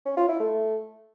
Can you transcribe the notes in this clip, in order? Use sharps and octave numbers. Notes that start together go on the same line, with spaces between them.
C#4
F4
E4
A3